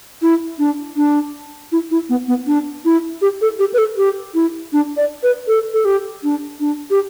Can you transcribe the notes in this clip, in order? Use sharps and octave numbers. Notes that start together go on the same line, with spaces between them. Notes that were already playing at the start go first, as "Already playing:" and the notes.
E4
D4
D4
E4
E4
B3
B3
D4
E4
G4
A4
G4
B4
A4
G4
E4
D4
D5
B4
A4
A4
G4
D4
D4
G4